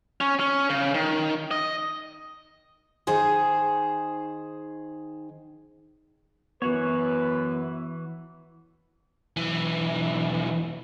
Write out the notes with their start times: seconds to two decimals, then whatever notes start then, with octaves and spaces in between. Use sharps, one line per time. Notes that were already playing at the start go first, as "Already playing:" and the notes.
0.21 C#4
0.40 C#4
0.70 C#3
0.94 D#3
1.51 D#5
3.07 D#3 D#4 G#4 C5
6.62 F#2 E3 B3 F#4 B4 C#5
9.37 B1 E3